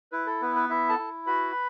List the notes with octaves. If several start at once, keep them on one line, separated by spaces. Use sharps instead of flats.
E4 B4
A4
B3 B4
B4
E4 E5
A4 A5
E4
F#4 B4 B5